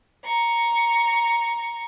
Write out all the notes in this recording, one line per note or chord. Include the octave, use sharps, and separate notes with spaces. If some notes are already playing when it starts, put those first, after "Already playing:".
A#5 C#6